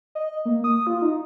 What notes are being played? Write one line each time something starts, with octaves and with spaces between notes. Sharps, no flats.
D#5
A#3
D#6
F4
D#4